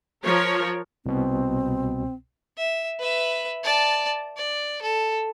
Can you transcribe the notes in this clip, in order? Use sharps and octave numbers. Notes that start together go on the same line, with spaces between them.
F3 A#4 C#5
C2 B2 C4
E5
B4 E5
D5 A5
D5
A4